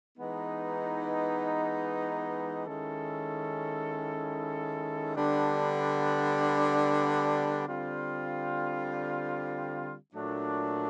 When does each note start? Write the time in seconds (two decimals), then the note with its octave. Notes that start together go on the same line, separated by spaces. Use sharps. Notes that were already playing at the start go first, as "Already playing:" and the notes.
0.17 E3 G#3 B3 D#4
2.66 D#3 G#3 C#4 E4 A4
5.15 D3 G3 B3 D4
7.65 D3 G3 C4 F4
10.13 A#2 F#3 A3 D4